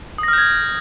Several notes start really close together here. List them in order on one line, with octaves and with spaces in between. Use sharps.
D#6 A#6 F6 G6 G#6